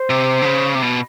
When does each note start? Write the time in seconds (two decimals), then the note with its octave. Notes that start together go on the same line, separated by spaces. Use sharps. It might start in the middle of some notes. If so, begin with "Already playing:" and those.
Already playing: C5
0.10 C3
0.42 D3
0.46 C#3
0.75 C3
0.82 B2